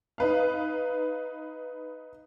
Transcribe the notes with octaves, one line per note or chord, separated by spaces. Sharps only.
D#4 B4 F5